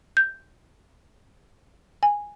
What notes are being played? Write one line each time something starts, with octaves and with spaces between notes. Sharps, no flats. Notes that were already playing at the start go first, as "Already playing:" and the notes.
G6
G#5